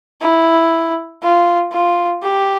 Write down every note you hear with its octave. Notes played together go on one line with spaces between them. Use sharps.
E4
F4
F4
G4